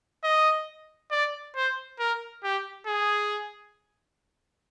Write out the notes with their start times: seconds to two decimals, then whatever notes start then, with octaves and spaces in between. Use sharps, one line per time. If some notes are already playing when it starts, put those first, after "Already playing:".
0.24 D#5
1.11 D5
1.56 C5
1.99 A#4
2.44 G4
2.87 G#4